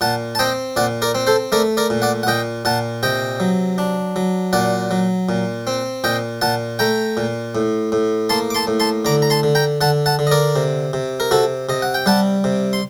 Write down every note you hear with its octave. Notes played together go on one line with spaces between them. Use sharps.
A#2 F#5 A5
A5
C4 D#5 G5
A#2 D5 F#5
A#4 D5
C4
A4 C5
A3 A#4 D5
A#4 D5
A#2
D5 F#5
F#5
A#2 D#5 G5
A#2 F#5 A5
C3 D#5 G5
F#3
D4
F#3
A#2 D5 F#5
F#3
A#2
C4
A#2 D#5 G5
A#2 F#5 A5
A3 G5 A#5
A#2
A2
A2
A#3 A5 C6
D6
A5 C6
A2
A5 C6
D3 A#5 D6
A#5
A5 C6
D3
G5 A#5
D3 F#5 A5
F#5 A5
D3
D#5
A#4 D5
C3
C3
A#4
C3 F#4 A4
C3 D#5
F#5
G5
G3 F#5 A5
C3
C6